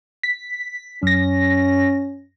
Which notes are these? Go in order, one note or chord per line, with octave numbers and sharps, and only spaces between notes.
B6
F#2 C#4 A#6